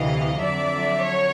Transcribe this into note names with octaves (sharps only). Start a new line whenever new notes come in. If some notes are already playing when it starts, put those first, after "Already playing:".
Already playing: D2 C3 E3 D#5 F5
F2 D3 F#3 D5 E5
C#5